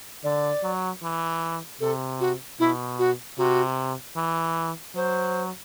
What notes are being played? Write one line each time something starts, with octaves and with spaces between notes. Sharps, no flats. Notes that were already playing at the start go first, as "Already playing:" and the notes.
D3 D5
F#3
E3
C3 A4
F#4
B2 E4
F#4
C3 F#4
E3
F#3 C5